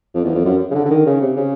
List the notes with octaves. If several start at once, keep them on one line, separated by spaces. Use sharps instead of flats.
F2
E2
F2
F#2
C#3
D3
D3
D#3
C#3
C3
C#3